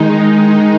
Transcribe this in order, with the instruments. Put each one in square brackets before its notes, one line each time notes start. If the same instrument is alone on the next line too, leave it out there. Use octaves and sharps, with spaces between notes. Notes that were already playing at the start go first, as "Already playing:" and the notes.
Already playing: [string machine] D#3 G#3 D#4